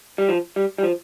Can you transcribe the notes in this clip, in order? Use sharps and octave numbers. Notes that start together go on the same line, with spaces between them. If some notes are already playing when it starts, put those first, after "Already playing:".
G3
F3
G3
G3
F3